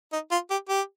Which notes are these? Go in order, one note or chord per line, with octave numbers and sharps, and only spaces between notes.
D#4
F4
G4
G4